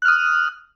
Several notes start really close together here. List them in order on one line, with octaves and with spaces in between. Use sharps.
F#6 F6 D#6